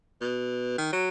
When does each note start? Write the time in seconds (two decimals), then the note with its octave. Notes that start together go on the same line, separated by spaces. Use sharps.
0.21 B2
0.78 D#3
0.93 F#3